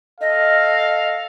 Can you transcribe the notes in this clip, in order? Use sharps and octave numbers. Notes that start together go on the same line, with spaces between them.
A4 D#5 F5